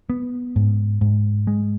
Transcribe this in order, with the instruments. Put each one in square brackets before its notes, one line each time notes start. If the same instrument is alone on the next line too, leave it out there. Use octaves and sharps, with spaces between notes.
[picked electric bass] B3
G#2
G#2
G#3